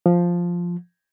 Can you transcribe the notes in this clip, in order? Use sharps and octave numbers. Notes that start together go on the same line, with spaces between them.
F3